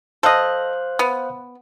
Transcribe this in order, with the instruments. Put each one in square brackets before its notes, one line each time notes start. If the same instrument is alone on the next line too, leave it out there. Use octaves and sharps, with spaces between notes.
[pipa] A4 D#5 [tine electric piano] C5 F5 F#6
[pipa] B3